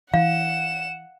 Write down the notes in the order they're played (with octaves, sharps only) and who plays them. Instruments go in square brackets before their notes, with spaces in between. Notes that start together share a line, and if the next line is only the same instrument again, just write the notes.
[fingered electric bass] E3 [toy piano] F5 [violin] F#5 E7